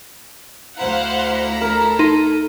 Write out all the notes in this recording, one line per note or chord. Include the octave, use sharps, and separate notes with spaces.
D2 E4 C5 F5 F#5 A#5
A4 A#4
D#4 C6